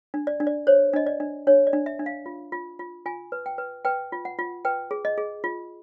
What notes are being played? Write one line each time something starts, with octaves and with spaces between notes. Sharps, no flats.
D4
D5
D4
D5
C5 C#5
D4 D#5
D5
D4
D4 C#5
D5
D4
E5
D4
F5
F4
F4
F4
F4 G#5
B4
G5
B4
B4 G5
F4
F#5
F4
B4 G5
G#4
D#5
G#4
F4